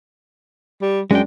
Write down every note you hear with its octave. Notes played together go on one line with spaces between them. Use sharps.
G3
F#2 G#3 D4 G5